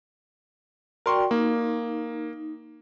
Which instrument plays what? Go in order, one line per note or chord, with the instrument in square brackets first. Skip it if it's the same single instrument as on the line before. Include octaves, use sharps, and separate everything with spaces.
[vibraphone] F#4 D5 G5 [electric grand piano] A#4 C6 C#6
[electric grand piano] A#3 [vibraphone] D#4